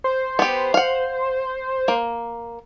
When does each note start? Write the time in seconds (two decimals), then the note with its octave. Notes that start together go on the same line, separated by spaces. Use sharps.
0.04 C5
0.39 B3 G4
0.74 F5 F#5
1.88 A#3